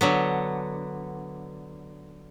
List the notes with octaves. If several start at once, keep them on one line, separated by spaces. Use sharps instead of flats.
D3 F#3 B3